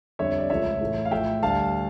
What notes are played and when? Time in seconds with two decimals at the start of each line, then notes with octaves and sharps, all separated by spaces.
0.19 F2 D3 G3 C#5 E5
0.38 D5
0.50 C#2 C#3 F3 A3 C#5 E5
0.80 A2 E3 A3
1.05 F5
1.11 A2 F3 A3 E5 G5
1.42 D2 D3 G3 F5 A5